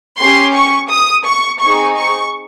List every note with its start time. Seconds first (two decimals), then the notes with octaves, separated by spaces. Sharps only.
0.19 C#4 G4 C6
0.55 C#6
0.90 D#6
1.26 C#6
1.61 C4 D#4 G#4 C#6
1.97 C#6